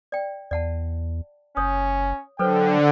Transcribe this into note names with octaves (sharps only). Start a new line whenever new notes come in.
D5 G5
E2 D5 F#5 A5
F#1 C#4 C#5 D#6
D3 F#3 A4 B4 C5 G5